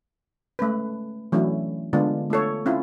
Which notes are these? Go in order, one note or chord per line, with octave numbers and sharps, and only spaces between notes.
G#3 A3 C#4 B4
E3 F#3 A3 C#4 D4 E4
D3 G#3 B3 D4 F4
A3 F4 A4 C#5
C4 C#4 E4 F4